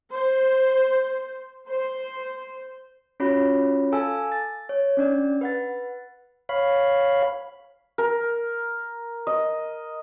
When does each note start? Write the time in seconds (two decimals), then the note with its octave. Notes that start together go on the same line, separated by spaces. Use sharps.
0.10 C5
1.68 C5
3.20 C#4 F4 F#4 C#5 B5
3.92 A4 F5 G#5 A5 E6
4.32 A6
4.69 C#5
4.97 C#4 D4 D5
5.41 B4 F#5 A6
6.49 C#5 F5 B5
7.98 A#4
9.27 D#5